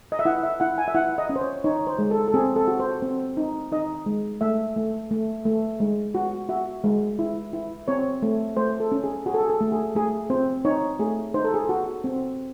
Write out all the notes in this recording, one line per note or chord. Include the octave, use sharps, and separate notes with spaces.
D#5
E5
E4 F#5
E5
E4 F#5
G#5
E5
E4 F#5
D#5
C#4
C5
C#5
D#4 C#5
C5
G#3
A4
A4
C4 G#4
A4
F#4
C5
C4
D#4
D#4 D#5
G#3
A3 E5
A3
A3
A3
G#3
F#4
F#4 E5
G#3
E4
E4
C4 C#5
A3
A3 C5
A4
C#4
G#4
F#4 G#4
A4
G#4
A4
A3
G#4
A3 G#4
C4 C5
D#4 C#5
A3 G#4
D#4 C5
A4
G#4
A4
F#4
C4